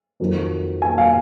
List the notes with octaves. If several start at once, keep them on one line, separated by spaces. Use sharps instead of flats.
F2 D#3 F#3
G#5
F5